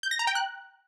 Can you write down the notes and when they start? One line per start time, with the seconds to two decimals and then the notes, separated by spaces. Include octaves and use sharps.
0.03 G6
0.11 A#6
0.19 A#5
0.27 G5
0.35 F#6